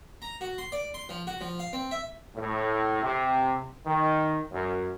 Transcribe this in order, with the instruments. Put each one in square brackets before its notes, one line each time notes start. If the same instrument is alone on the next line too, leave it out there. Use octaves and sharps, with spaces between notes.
[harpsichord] A#5
F#4
C6
D5
C6
F3
F#4
F3
F5
C4
E5
[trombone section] A2
C3
D#3
F#2